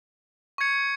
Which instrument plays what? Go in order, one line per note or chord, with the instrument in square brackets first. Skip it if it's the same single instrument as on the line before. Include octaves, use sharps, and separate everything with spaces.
[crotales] C#6 G#6 C#7